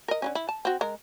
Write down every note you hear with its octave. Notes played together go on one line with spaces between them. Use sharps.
A#4 D#5
D3 F#3 C#4
E4
A5
C4 F#4
G#3 A#4